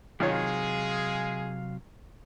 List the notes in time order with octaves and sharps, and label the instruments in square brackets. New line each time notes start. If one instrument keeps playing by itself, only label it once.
[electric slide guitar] C3 F#3 [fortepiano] D#3 F4 C#5 [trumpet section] G#3 G#4 [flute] F5